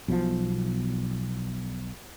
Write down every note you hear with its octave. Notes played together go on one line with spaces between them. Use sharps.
B1 B2 E3 F3